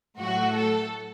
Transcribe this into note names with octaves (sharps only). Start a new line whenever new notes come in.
A2 F#3 A3 F#4
A4